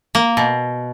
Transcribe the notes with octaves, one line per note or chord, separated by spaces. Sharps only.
A#3
B2